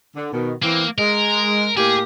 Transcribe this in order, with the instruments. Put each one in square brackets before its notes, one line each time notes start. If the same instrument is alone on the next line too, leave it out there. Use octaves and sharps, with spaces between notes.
[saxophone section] D3
B2 D#3
[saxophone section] E3 C4 [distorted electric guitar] A#3
[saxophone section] G#3 [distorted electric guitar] A#4
[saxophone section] A2 A#3 G4 [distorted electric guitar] G#4